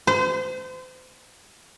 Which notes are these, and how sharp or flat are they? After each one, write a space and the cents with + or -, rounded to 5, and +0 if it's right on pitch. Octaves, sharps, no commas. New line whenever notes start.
C5 -35